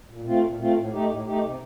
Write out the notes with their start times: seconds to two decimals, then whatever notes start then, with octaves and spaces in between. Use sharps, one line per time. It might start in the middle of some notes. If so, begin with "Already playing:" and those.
0.08 A#2
0.26 A3 C4 F4
0.43 A#2
0.59 A3 C4 F4
0.76 A2
0.92 A3 D#4 G4
1.08 A2
1.26 A3 D#4 G4
1.43 C3